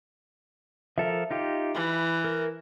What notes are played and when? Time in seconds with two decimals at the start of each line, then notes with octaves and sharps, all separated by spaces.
0.98 F3 A4 A#4 E5
1.31 D#4 F4 G4
1.75 E3 B5
2.24 A#4